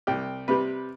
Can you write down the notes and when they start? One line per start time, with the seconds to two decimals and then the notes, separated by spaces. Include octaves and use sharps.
0.07 C2 G4
0.48 C3 G3 B4